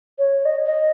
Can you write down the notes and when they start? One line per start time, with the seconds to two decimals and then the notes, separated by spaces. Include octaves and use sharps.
0.19 C#5
0.45 D#5
0.66 D#5